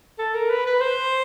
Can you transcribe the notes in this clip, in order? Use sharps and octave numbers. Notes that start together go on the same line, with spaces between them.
A4
A#4
B4
B4
C5